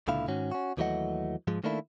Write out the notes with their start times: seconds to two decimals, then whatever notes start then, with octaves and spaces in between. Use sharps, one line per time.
0.08 C#2 A#2 D3 E4 F5
0.28 G#2 D#3 C#4 F#4
0.51 C#4 F#4
0.77 D#2 E3 F#3 A3 D#5 F#5
1.47 G#2 F3 G#3
1.64 D#3 A3 A#3 D4 E4